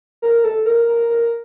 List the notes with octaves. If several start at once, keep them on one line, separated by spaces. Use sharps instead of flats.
A#4
A4
A#4
A#4
A#4